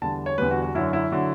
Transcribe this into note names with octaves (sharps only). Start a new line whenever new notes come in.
E2 D3 G3 A5
C#5
E2 D3 G3 B4
F#4
F#4
F#2 D3 F#3 E4
E4
D3 F#3